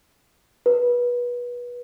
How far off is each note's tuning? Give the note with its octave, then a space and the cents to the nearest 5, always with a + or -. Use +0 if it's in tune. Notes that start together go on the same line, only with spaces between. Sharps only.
B4 -25